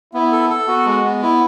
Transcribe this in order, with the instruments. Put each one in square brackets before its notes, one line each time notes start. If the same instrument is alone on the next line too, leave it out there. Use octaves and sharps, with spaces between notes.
[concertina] B3 [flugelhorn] E4
[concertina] A4
A4
[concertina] B3 [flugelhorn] F#4
[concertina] G#3
B3
E4